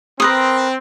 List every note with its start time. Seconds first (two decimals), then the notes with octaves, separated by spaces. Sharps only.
0.20 C4 A#4 B4 D#6